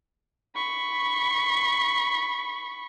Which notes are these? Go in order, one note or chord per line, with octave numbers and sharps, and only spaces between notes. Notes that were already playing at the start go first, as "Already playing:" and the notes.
B5 C#6